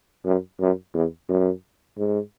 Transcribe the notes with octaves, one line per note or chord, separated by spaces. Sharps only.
F#2
F#2
E2
F#2
G#2